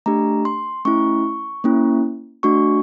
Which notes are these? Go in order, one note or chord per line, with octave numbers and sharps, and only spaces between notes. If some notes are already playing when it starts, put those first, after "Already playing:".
A3 D4 G4 A#5
C6
A3 C#4 E4 C#6
A#3 C#4 E4
A3 D4 F#4 C#6